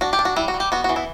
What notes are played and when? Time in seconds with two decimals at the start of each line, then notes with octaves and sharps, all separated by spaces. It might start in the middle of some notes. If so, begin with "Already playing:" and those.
0.01 D4 F#4
0.13 G4
0.19 D4
0.25 F#4
0.36 G3 E4
0.48 F#4
0.54 G3
0.60 G4
0.72 B3 F#4
0.84 F#4
0.89 E3
0.96 E4